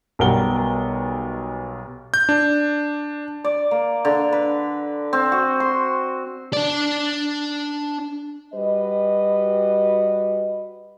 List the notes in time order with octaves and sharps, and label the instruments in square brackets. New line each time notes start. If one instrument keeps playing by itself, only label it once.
[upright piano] B1 B2 G3 A#4 F#5 G7
[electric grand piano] G6
D4
[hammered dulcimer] D5
A#3
D3
B4
C4
F#4
C6
[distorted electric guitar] D4 D5
[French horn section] G3 F#4 B4 D#5